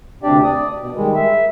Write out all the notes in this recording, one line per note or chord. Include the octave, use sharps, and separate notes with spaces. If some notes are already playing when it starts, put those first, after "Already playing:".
D2 C3 D4 G4 D5
D5 D#6
B2
D#3 G3 G#3
E5